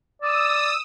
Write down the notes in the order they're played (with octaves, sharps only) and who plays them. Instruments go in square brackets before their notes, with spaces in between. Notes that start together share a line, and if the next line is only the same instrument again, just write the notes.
[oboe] D5 [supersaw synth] D#6 E6